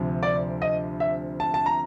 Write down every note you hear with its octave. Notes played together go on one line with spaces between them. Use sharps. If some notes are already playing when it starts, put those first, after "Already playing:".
Already playing: D2 C3 F3
D5
D#5
E5
A5
A5
A#5